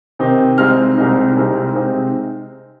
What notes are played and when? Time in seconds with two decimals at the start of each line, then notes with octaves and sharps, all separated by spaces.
0.19 C3 D#3 C4 D#4
0.58 C2 C3 G#3 C4 D#4 F6
0.97 C2 C3 G#3 C4 D#4
1.36 C2 C3 G#3 C4 D#4
1.75 C3 G#3 C4 D#4